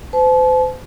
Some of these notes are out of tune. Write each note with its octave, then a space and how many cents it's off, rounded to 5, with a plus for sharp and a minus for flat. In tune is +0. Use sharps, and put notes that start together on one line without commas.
C5 -40 A5 -35